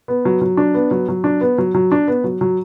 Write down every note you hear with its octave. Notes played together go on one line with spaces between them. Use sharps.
B3
F#3
F#3
D4
B3
F#3
F#3
D4
B3
F#3
F#3
D4
B3
F#3
F#3